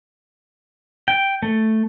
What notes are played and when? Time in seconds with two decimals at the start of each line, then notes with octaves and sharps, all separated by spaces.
1.08 G5
1.42 A3